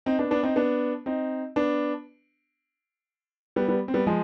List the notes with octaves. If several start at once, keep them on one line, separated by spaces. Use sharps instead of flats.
C4 D#4
B3 D4
B3 D4
C4 D#4
B3 D4
C4 D#4
B3 D4
G3 B3
G3 B3
C4
G3 B3
F3 G#3